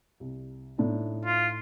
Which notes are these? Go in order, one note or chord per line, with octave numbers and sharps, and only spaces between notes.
C2
A2 D4 D#4
F4